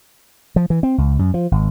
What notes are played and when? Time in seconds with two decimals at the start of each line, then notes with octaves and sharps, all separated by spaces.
0.56 F3
0.70 E3
0.83 C4
0.98 C#2
1.19 F#2
1.34 F3
1.52 G#1